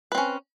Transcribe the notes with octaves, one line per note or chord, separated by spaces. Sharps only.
C4 C#4 B4